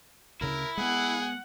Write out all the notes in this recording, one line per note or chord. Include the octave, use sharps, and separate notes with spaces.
D2 C#3 E4 A#4
G#3 B3 G#4 F#5